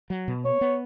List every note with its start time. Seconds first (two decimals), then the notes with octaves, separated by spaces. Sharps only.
0.10 F#3
0.28 B2
0.45 B3 C#5
0.61 B3